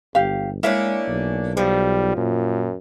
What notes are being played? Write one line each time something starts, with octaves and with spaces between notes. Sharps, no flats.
G1 G4 F5
G#3 A#3 C#4 D4 E4 E5
B1
F3 G3
F#2 A#2